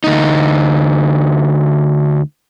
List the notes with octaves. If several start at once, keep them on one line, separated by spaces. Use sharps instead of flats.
D2 D#4